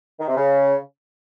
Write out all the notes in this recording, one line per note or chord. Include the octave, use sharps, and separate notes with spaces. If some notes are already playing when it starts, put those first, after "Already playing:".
D#3
C3
C#3